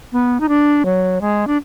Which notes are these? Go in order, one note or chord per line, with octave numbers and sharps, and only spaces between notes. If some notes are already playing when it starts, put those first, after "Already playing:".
B3
D#4
D4
F#3
G#3
D4